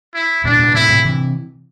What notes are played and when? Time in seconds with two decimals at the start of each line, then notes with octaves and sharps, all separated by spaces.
0.14 E4
0.44 G2 A#2 D4
0.59 G2 A#2
0.74 A2 C3 E4
0.89 A2 C3
1.04 C3 E3